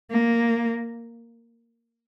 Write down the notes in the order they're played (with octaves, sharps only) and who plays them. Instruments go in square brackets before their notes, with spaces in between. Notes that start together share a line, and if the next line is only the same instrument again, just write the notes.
[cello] A#3